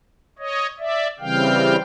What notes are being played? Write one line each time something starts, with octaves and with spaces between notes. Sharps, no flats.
C#5 D#5
D5 E5
C#3 E3 G3 C4 F5 G5